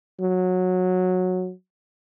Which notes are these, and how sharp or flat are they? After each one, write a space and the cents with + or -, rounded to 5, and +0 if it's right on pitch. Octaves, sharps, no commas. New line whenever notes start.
F#3 -15